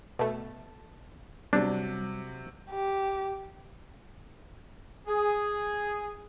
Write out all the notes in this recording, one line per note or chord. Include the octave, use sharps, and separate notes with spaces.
B2 A3 A5
C3 F#3 G3 D4
G4
G#4